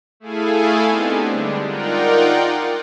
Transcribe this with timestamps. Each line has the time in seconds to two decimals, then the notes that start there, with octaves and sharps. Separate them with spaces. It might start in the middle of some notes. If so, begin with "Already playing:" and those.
0.20 A3 E4 G#4 A4 F5 G#5
0.85 B3 C4 D4 D#4 G4
1.28 D3 G3 G#3 D4
1.66 D#4 F4 A#4 D5 F#5 G5